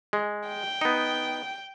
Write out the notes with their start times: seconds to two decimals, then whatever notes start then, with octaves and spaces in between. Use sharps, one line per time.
0.13 G#3
0.48 G5
0.81 B3 D#4